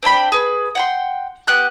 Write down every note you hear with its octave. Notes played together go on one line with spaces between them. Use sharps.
C4 D4 G5 B5
G#4 B4
F#5 G5 C6
B3 G4 F#6 G6